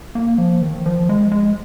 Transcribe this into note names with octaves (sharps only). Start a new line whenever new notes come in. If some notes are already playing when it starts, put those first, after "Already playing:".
A#3
F3
D#3
F3
G#3
G#3